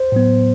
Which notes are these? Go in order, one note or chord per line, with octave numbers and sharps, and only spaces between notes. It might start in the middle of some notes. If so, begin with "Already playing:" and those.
Already playing: C5
A2 F#3 B3